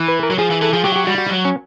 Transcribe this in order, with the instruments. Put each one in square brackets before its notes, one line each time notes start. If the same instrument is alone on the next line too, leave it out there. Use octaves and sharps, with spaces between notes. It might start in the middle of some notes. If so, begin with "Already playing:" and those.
Already playing: [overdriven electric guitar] E3
[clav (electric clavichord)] B4
A#4
[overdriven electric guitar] F#3
[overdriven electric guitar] F3 [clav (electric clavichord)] G#4
[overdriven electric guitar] E3
[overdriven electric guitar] E3 [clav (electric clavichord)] A4
[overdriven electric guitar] F3 [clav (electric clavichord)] G#4
[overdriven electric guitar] F#3 [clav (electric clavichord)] G4
[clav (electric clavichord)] G4
[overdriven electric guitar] G3 [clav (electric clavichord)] F#4
[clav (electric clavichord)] F#4
[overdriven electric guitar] F#3
[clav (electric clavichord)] C#4